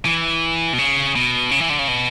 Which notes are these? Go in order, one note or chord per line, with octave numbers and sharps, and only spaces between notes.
E3
B2
C#3
B2
C#3
E3
D3
C#3
B2